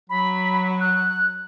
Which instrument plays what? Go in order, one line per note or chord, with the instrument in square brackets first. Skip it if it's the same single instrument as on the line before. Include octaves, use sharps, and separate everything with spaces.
[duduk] F#3 [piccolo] B5
[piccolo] F#6